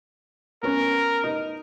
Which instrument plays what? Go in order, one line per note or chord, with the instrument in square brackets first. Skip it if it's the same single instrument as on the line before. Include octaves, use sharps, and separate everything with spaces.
[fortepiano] B3 C#4 [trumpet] A#4
[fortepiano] D#4